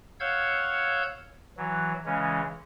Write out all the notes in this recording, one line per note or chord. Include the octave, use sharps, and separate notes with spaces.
C#5 F5 F#5 E6 G6 G#6
E3 F#3
C#3 E3 G#3 C#4